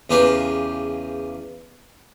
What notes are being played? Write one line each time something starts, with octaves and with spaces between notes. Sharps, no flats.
E2 C#3 F4 G4 A#4 B4